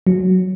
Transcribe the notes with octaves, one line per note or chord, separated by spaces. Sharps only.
F#3